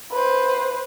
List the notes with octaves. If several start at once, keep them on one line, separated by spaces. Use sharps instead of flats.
B4 C5